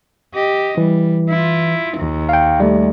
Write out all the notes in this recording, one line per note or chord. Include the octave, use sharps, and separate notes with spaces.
G4 D#5
E3 G3
E4 F4
D#2
F5 G5
G3 A3